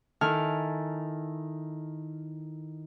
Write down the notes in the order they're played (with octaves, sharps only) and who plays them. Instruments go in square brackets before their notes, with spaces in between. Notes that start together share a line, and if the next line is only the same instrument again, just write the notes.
[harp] D#3 E4 A4 G#5 A5 F6